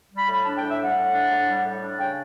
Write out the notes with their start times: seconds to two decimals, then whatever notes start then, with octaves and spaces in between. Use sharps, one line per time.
0.11 G3
0.18 B5
0.27 A2
0.34 B5
0.44 D4 A5
0.58 A2 G5
0.70 E5
0.79 G3 F#5
0.96 A2
1.14 D4
1.30 A2
1.48 G3
1.65 A2
1.82 D4
1.99 C#3 G5